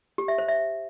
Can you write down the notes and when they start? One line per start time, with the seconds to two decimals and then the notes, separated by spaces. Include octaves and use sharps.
0.18 G4
0.28 E5
0.38 C5
0.48 E5